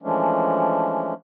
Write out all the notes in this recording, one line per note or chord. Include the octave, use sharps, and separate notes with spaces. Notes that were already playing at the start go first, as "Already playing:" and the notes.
E3 F3 G#3 A3 C#4 D4